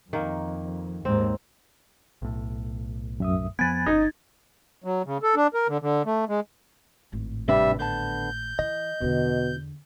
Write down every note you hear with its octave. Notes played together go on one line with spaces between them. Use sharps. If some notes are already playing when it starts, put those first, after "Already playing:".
F2 D#3 A#3
D#2 G#2 C4
B1 A2
F#2 E5 D#6
F2 F3 B3 G#5 B5 F#6 G#6 A6
G1 D#4
F#3
C#3
A4
D4
A#4
D3
D3
A3
G#3
G#1 A2
C3 G3 D4 B4 E5
D3 B3 A5 G6
E3 D#5
E2 B2 D3